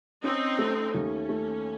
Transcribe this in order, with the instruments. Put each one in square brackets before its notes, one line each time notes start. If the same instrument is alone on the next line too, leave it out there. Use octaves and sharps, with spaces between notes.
[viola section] C4 D#4 [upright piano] C#4
[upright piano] A3
[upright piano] D#2 [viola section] C#4
[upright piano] A3